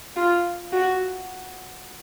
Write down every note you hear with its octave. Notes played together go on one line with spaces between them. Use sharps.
F4
F#4